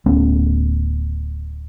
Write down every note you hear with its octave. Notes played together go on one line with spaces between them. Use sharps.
D1 A3 B3 C#4